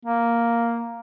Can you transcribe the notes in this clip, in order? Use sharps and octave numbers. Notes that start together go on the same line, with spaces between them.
A#3